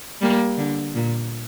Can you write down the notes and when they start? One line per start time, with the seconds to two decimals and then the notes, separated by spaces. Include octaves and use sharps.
0.21 G3 A#3
0.57 D3
0.94 A#2